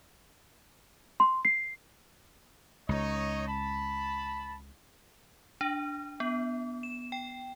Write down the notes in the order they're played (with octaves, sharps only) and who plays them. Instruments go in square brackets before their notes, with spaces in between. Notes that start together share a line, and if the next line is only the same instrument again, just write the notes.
[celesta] C6
C7
[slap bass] C#2 [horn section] D#4 C#5 D#5
[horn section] A5 B5
[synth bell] D4
B3
E7
G5